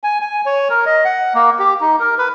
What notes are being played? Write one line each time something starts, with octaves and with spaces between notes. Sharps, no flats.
G#5
G#5
C#5
A#4
D#5
F#5
A#3
G4
D#4
A#4
B4